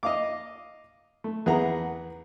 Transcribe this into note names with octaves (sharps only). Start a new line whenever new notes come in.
D#5 F5 D6
A3
E2 B3 G#4 F#5 A#5